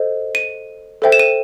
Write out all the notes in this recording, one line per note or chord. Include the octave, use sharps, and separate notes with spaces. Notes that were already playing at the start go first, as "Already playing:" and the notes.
Already playing: A4 C5 D#5
D#7
A4 C5 E5 G5
E7
D#7